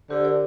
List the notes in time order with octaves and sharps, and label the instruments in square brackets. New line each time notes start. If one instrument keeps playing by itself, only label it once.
[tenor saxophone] D3 [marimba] G4 C5
[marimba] A#4 D5